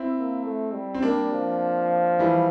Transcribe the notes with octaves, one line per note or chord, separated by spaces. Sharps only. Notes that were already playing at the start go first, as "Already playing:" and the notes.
Already playing: C4 E4
A#3
A3
G3
C4
G3 A#3 D4
F3
E3 G3